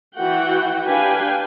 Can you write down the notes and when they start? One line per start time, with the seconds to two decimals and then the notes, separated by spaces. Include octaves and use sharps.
0.15 E3 F#4 F#5 G5
0.86 D4 G4 B4 F5 G5 G#5